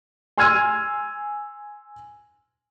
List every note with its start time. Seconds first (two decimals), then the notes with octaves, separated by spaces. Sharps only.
0.38 G#5 C6 E6 F6 G#6 D#7